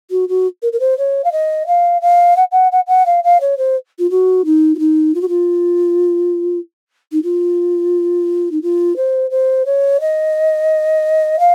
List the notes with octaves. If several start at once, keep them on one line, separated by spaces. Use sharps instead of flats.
F#4
F#4
A#4
A#4
C5
C#5
F5
D#5
F5
F5
F#5
F#5
F#5
F#5
F5
F5
C#5
C5
F4
F#4
D#4
F4
D#4
F4
F#4
F4
D#4
F4
D#4
F4
C5
C5
C#5
D#5
F5